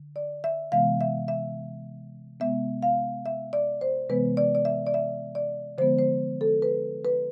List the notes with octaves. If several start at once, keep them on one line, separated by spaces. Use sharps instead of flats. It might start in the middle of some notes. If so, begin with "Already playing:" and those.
Already playing: D3
D5
E5
C3 E3 G#3 B3 F5
E5
E5
C3 G#3 B3 E5
F5
E5
D5
C5
C3 E3 G#3 B3 B4
D5
D5
E5
D5
E5
D5
D3 F3 G#3 B3 C5
C5
A4
B4
B4